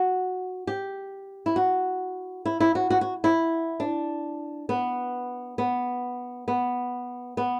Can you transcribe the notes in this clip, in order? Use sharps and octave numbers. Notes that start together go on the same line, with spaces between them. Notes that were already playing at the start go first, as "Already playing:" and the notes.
Already playing: F#4
G4
E4
F#4
E4
E4
F#4
F#4
F#4
E4
D4
B3
B3
B3
B3